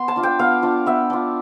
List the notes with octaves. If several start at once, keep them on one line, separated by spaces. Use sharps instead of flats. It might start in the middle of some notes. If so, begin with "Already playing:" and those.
Already playing: B3 C6
A5
D4 F4
G5
B3 F5
D4 F4
B3 E5
D4 F4